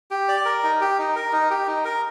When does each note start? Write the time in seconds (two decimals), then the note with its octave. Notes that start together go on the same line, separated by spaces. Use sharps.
0.11 G4
0.28 D5
0.45 A#4
0.63 D#4
0.81 G4
0.99 D#4
1.16 A#4
1.33 D#4
1.50 G4
1.67 D#4
1.85 A#4